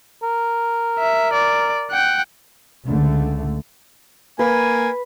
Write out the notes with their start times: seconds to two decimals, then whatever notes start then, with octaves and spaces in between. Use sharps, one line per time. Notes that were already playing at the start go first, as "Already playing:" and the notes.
0.23 A#4
0.99 E5
1.33 D5
1.91 F#5 G5
2.87 C#2 D3 A3
4.39 A#3 B4 G#5